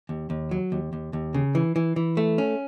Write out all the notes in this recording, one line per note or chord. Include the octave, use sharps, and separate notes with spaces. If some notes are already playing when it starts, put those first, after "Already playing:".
D#2
D#2
F#3
D#2
D#2
D#2
C#3
E3
E3
E3
A3
C#4